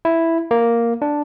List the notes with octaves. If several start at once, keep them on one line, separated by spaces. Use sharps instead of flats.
E4
A#3
D4